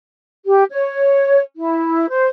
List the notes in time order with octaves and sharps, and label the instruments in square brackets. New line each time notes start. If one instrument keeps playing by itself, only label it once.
[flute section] G4
C#5
E4
C5